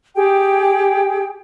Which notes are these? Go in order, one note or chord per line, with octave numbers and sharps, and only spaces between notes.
G4 G#4 G5